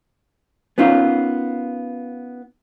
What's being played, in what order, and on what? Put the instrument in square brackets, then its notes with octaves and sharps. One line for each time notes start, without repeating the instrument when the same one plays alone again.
[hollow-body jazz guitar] B3 C#4 D#4 F4 A#4 B4